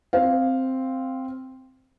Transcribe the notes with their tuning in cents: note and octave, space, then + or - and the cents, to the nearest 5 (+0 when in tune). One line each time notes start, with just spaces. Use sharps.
C4 +0 F5 +0